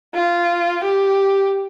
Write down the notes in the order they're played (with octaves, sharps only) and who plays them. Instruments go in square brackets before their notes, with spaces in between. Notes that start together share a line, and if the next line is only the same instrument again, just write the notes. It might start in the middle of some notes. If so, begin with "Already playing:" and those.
[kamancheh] F4
G4